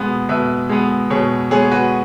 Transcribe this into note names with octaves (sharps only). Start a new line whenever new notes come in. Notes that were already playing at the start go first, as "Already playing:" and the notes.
Already playing: B2 G#3 B3
B2 B4 E5
G#3 B3
B2 G#4 C#5
G#3 B3 G#4 C#5
F#4 B4